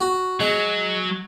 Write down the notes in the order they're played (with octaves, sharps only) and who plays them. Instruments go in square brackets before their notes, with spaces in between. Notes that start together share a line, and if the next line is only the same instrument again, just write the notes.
[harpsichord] F#4
[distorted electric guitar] F#3 [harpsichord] G#3